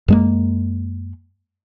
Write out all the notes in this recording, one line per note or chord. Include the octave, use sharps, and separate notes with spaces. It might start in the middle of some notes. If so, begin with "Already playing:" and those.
F#2 G#3 A#3